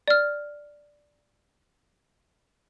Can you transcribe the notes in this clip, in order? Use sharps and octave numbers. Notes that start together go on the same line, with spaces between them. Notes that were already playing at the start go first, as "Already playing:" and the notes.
D5 F6